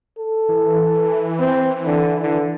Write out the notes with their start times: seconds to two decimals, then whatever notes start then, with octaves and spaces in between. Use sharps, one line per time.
0.18 A4
0.49 E3
1.39 C4
1.86 D3
2.22 D3